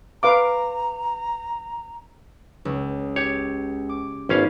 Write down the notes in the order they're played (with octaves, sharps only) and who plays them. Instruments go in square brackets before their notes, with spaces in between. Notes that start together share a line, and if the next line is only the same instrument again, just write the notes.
[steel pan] B4 F5 D6 [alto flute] A#5
[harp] C#2
[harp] G4 [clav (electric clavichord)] C#5
[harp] D6
[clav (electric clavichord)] G#1 C#4 F5 [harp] B3